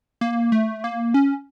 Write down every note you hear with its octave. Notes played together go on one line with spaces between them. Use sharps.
A#3
A3
A#3
C#4